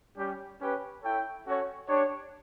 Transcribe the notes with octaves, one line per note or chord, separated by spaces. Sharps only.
G3 C#4 G4
C#4 G4 B4
E4 A4 C#5 G5
C#4 F#4 A4 C#5
D4 G4 C#5